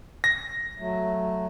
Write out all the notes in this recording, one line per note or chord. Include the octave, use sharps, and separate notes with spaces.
A#6
F#3 A3